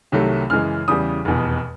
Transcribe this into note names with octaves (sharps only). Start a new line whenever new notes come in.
C2 C3 D#3 F#3 A3
F#2 C#3 E3 G#3 F6
E2 C#3 E3 G3 D#6
F1 E2 B2